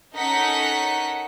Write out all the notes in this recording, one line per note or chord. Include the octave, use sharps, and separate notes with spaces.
C#4 D#4 A4 A#4 F#5 B6